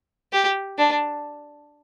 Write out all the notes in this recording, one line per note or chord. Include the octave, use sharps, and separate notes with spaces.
G4
D4